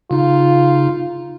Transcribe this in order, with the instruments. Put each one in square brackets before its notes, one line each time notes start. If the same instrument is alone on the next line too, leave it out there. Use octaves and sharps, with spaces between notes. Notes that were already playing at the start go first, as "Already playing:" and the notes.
[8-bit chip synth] C#3 D#4 [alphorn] F4